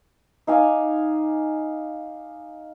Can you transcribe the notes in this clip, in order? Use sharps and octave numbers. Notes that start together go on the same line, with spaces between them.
D#4 F5 G#5 D6